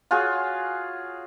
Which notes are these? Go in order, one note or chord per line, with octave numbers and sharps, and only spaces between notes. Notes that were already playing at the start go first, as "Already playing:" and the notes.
F4 F#4 G#4 C#5